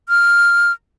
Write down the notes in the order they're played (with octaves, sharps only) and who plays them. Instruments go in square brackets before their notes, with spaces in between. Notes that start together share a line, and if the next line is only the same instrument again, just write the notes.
[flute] F6